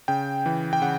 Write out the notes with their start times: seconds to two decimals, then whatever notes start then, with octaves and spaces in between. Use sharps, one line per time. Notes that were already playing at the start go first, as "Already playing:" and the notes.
0.08 C#3 G5
0.46 E3
0.73 G5
0.82 C#3 F#5